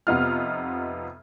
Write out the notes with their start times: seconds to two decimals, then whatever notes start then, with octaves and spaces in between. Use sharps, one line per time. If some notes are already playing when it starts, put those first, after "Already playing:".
0.07 F2 C3 B3 D#4 F4 F6